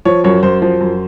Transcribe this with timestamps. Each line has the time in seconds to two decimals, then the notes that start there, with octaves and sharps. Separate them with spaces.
0.05 F3 C#5
0.24 F#2 C#5
0.43 F#2 C5
0.62 F3 C5
0.81 F#2